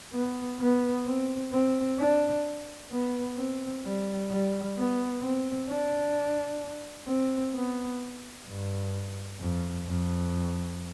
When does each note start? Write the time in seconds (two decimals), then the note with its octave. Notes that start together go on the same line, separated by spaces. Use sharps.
0.13 B3
0.60 B3
1.06 C4
1.53 C4
1.99 D4
2.91 B3
3.38 C4
3.85 G3
4.30 G3
4.77 B3
5.22 C4
5.69 D4
7.08 C4
7.55 B3
8.47 G2
9.40 F2
9.86 F2